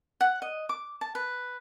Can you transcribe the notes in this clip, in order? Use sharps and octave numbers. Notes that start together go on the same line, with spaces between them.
F#5
D#5
D6
A5
B4